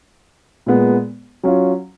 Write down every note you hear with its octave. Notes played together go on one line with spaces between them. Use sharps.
A#2 G#3 B3
F#3 C#4 F4